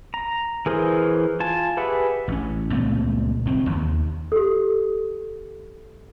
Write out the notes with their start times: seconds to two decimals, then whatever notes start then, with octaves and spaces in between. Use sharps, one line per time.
0.14 A#5
0.66 E3 G#4 A#4 C5
1.40 F4 G#5 A5
1.77 G4 G#4 B4 E5 F#5
2.28 A1 C#4
2.72 C#2 A#2 A3 C4
3.45 F1 D#3 C4
3.67 D#2 D#3
4.32 G4 A4